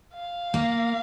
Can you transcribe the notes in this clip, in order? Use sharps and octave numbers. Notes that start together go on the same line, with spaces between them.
F5
A#3